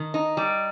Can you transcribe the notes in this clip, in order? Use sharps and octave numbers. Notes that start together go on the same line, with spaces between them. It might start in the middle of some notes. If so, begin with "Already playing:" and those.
Already playing: D#3
D#4
G3